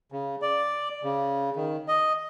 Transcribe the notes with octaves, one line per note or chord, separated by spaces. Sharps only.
C#3
D5
C#3
D#3
D#5